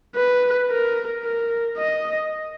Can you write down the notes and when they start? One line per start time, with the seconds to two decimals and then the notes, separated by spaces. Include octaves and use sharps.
0.16 B4
0.70 A#4
1.24 A#4
1.78 D#5